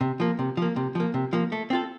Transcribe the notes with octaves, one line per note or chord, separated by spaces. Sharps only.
C3
F3 A#3
C3
F3 A#3
C3
F3 A#3
C3
F3 A#3
A3
C4 F4 A4